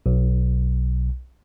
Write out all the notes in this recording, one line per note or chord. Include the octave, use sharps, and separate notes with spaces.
B1